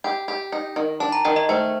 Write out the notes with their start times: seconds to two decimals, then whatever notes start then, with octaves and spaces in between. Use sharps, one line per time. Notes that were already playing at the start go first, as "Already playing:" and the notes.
0.04 G4 G5
0.28 G4
0.52 D#4
0.76 D#3
1.00 D4 A5
1.12 A#5
1.25 D#3 G5
1.36 D#5
1.49 A3 C5